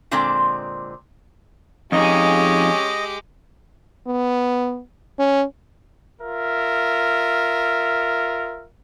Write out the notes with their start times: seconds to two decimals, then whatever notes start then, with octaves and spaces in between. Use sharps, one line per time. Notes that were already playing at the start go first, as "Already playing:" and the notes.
0.11 A#2 D3 G#3 C4 D5 A#5
1.92 F2 G#3 C#4 D#4 G4 G#4 D#5
4.07 B3
5.19 C#4
6.22 F4 A#4 E5